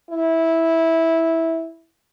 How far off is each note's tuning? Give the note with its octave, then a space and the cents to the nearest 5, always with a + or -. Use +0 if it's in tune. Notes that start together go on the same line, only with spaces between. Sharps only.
E4 -10